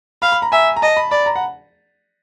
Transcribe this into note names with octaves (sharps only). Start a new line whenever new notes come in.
F5 B5
B5
A#5
E5 G#5
A#5
D#5 A5
B5
D5 B5
A#5
F#5